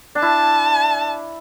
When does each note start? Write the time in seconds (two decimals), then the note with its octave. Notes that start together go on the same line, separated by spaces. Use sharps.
0.15 D4
0.22 E4 A5